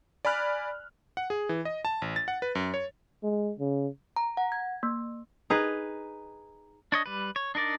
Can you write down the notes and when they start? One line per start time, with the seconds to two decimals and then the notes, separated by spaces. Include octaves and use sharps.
0.25 D5 G#5 B5 F6 F#6
1.17 F#5
1.30 G#4
1.49 E3
1.65 D#5
1.85 A5
2.02 A1
2.16 A6
2.28 F#5
2.42 B4
2.55 F#2
2.74 C#5
3.23 G#3
3.59 C#3
4.16 A#5
4.37 F#5
4.52 G#6
4.83 A#3
5.50 D#4 G#4 B4
6.92 D4 C#5 D#5
7.06 G3 B4
7.36 C#5
7.55 D4 D#4 A#4 D5